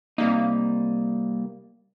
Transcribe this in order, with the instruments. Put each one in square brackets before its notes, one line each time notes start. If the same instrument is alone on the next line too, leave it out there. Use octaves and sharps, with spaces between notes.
[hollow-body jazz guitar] C3 G3 D#4 [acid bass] A#3